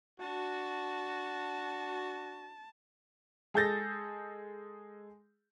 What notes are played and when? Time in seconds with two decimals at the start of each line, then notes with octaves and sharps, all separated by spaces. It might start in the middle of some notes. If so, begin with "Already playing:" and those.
0.20 D4 F#4 A5
3.54 G#3 G#4 A4 G6 A6 A#6